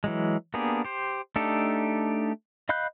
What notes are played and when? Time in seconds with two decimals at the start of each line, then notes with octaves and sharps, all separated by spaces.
0.04 E3 F#3 G#3
0.54 A#3 B3 D4 G4 G#4
0.85 G4 C5
1.36 A3 D4 D#4 G4 A4
2.69 D#5 F5 B5 F#6 G6